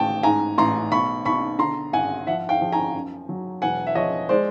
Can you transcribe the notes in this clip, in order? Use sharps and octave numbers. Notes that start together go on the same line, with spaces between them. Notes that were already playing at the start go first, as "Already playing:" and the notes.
Already playing: A1 G5 A5
G#2 G#5 A#5
A1 A#5 C6
B1 B5 C#6
B1 B5 C#6
D3 A#5 C6
G#1 F#5 G#5
F3 E5 F#5
F5 G5
F3
G#5 A#5
F#2
F#3
E1 F#5 G#5
E5
F3 C#5 D#5
G#3 C5 D5